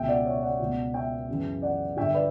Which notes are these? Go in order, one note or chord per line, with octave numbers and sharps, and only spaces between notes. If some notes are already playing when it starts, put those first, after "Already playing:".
Already playing: C#2 B2 E5 G5
D5 F#5
C#5 E5
D5 F#5
C#2 B2
E5 G5
F#2 C#3 E3
D5 F#5
G2 D3 E5 G5
B4 D5